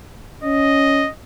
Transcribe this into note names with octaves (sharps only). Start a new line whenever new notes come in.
C#4 D#5